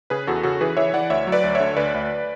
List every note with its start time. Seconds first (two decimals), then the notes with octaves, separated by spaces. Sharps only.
0.10 C#3 G#4 B4
0.27 E2 F#4 A4
0.43 C#3 F#4 A4
0.61 E3 G#4 B4
0.77 E3 C#5 E5
0.94 E3 D5 F#5
1.10 D2 C#5 E5
1.27 F#3
1.32 B4 D5
1.44 D2
1.55 C#5 E5
1.60 D3
1.77 D2 B4 D5
1.94 D2